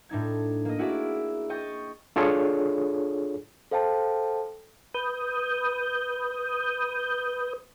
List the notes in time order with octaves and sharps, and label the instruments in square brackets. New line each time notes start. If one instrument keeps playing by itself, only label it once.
[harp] A2 D4 D#4 G#6
A#3 D#5
E4 F#4 G#4 D5 E5
D#5 G5 C#6 D#6 A6
[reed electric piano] D4 F4 G#4 A4 C#5
[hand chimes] A4 C5 F5 G5 A5
[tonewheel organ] B4 D#6 G6